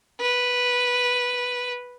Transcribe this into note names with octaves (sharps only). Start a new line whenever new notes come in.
B4